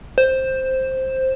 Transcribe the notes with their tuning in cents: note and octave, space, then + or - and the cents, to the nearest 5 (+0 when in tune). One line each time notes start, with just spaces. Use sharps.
C5 +5